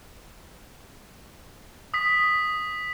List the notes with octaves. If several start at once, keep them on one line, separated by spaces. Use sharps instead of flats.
D#6 B6